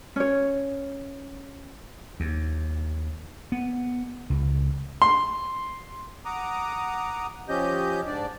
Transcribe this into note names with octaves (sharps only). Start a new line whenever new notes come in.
C#4 C#5
D#2
B3
C#2
C6
F#5 A#5 D6 D#6
F3 C#4 G4 D#5 G6
G#2 D4 D5